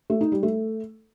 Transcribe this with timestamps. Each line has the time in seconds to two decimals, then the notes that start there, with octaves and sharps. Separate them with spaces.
0.10 A3
0.21 D#4
0.32 G3
0.43 A3